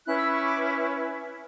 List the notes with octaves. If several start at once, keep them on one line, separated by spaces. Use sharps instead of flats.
C#4 E4 B4 F#6
E6
C#6
D6